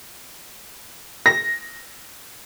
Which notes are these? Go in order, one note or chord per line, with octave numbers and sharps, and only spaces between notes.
A#6